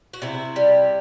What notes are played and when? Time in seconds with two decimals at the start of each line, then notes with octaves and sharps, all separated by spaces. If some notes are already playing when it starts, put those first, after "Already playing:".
0.13 F#4
0.22 C3 E4
0.56 G3